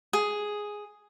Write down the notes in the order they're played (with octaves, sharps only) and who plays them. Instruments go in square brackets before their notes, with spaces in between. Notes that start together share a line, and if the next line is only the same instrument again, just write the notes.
[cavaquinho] G#4